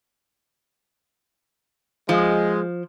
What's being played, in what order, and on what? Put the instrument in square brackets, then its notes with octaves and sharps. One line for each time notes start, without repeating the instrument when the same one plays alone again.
[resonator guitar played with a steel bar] F3 [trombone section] G#3